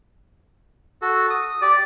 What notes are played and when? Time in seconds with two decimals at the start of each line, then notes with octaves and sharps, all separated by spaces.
1.02 F#4 A4
1.30 D#6
1.62 G4 D5